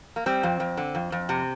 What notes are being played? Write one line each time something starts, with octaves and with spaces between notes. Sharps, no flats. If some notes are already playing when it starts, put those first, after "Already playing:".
A#3
G3 C4
F2
F2
D3
F2
F2
C3